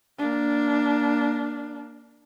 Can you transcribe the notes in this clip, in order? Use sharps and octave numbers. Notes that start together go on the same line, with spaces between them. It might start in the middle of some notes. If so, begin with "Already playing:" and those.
A#3 D4